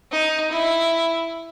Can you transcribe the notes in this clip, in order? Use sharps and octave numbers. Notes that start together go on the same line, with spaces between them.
D#4
E4